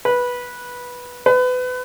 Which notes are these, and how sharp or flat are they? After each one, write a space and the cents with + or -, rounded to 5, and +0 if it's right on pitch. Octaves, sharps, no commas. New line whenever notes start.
B4 -10
B4 +30